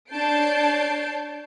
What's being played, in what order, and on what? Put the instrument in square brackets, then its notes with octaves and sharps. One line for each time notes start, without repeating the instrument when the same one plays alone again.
[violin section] D4 C#5 A5 G6 C7 D7